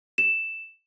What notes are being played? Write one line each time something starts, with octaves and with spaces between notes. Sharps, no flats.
E7